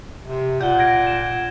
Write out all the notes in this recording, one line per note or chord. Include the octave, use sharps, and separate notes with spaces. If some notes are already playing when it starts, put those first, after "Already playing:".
C3
A#2 F#5 G6 G7
G#6 A#6 D7
D7 E7